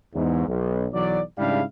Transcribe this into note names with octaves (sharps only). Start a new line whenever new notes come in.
E2 G#2
B1
B1 E3 F#3 D5
G#2 C#3 G3 D4 E4 F5